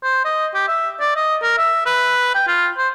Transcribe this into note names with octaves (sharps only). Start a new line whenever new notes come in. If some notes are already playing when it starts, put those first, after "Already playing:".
C5
D#5
G4
E5
D5
D#5
A#4
E5
B4
G5
F4
C5